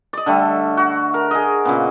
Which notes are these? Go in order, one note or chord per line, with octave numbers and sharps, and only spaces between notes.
D5 D#5
D3 G3 A3
F#4
A#4
G#4 D#5
A#2 C#3 B3